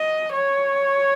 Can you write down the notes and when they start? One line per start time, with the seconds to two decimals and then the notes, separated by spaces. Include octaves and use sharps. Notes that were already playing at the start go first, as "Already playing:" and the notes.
Already playing: D#5
0.33 C#5